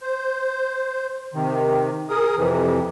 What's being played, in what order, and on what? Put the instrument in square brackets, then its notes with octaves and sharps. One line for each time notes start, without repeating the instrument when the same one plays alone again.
[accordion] C5
C3 D#3
G#4 A#4 D#6
F2 C3 E3